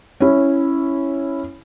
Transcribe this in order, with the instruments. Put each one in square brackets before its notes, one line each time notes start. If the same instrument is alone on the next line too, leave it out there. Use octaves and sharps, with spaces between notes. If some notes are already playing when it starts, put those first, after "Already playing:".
[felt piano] C#4 E4